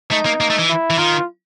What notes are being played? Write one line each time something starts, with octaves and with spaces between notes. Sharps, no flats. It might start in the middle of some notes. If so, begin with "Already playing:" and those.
A3 D#4
A#3
A#3
A3
E3
E4
E3
D#3 F4